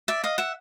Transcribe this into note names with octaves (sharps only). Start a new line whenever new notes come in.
D5 E5
D#5 F5
E5 F#5